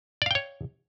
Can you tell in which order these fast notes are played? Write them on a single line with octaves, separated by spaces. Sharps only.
D5 F5 G5 C#5